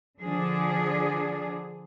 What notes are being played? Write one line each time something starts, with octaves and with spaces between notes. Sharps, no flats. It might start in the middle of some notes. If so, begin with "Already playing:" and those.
D3 F3 D4 G#4